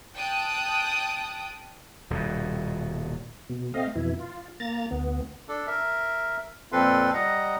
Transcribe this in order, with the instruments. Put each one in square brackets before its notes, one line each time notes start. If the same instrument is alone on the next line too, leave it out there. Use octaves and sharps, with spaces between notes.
[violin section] G5 A5 D#6 F#6 D7
[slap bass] D#1 G2 B2
[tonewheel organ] B2
A3 C4 D#5 F5
F2 B2 E3 E4
F4
A#3 A#5 A6
D2 B3
[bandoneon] D4 A4
A#4 E5
F2 A#2 C4 A4 B4 C6
G3 D#5 F#5 A#5